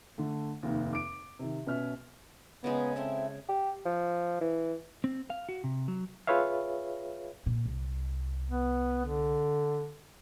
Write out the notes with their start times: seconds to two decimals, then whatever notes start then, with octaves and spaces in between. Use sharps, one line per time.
0.18 D3 A3
0.63 F1 D#2
0.93 D6 D7
1.39 C3 D#3
1.67 B2 C#4 E5 F6
2.64 C#3 G#3 B3 D#4 A#4
2.96 A3 C4 E4 E5
3.49 G4
3.85 F3
4.41 E3
5.04 C4
5.30 F5
5.49 F#4
5.64 C3
5.88 F#3
6.27 F4 G#4 B4 C#5 E5 F5
7.46 A#2
7.66 C2
8.50 B3
9.05 D3